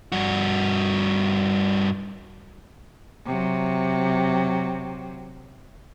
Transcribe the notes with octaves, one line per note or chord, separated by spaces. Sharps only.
G2 F#4
C3 F#3